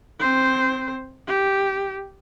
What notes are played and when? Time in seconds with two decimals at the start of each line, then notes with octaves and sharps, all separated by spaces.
0.20 C4 C5
1.27 G4